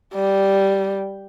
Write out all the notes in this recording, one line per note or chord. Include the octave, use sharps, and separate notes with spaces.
G3